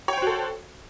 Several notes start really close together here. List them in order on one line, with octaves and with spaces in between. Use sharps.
C#5 G5 C5 F#4 A4